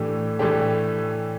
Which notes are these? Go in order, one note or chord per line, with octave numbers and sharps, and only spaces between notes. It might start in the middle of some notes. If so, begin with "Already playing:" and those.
Already playing: A2 E3 A3 D4 G4
A2 E3 A3 D4 G4